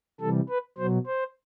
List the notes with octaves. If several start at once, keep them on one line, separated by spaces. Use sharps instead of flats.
C3 E3 G3 A4
B4
B2 F#3 C5
C5